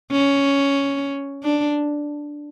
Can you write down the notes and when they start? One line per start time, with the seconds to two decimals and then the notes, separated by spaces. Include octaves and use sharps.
0.11 C#4
1.43 D4